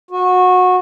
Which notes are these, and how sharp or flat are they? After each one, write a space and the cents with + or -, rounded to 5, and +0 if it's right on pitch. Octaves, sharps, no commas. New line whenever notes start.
F#4 -20